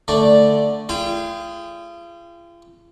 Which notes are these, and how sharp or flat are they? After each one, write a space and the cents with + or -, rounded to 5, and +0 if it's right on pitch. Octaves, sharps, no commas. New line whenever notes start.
D3 +0 A3 +0 D5 -5
F4 -40 G#4 -5 G5 +0